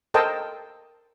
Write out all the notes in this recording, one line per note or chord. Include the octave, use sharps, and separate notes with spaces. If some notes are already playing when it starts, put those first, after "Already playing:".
A4 A#4 C5 D#5 G5 A5